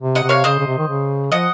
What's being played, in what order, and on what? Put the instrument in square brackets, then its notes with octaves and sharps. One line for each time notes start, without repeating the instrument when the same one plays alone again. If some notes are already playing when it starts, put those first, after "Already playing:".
[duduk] C3
[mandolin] D#5 F#5
[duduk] C3
[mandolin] C#5 F5
[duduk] C#3 [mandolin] C5 D#5
[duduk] C#3
C3
D#3
C#3
[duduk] F3 [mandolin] D#5 F#5